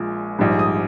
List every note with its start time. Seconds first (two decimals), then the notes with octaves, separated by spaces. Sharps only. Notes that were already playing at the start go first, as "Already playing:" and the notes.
Already playing: A#1 A#2 G#3
0.39 A#1 G#2 G3
0.59 D#6